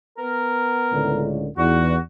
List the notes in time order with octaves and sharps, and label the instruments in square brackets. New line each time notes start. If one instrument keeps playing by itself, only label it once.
[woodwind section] B3 A#4
[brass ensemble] C#2 A2 D3
[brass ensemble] E2 [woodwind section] D4 D#4 F#4